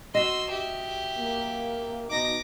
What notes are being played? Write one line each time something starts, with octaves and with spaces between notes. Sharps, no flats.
F#4 D#5 C6 E6
G4 E5
A#3
B2 D#4 D6 A#6